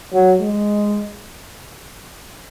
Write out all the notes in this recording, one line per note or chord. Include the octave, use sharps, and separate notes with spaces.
F#3
G#3